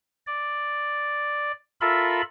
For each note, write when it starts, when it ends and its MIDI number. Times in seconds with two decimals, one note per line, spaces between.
0.27 1.52 74
1.81 2.22 65
1.81 2.22 69
1.81 2.22 70
1.81 2.22 76
1.81 2.22 83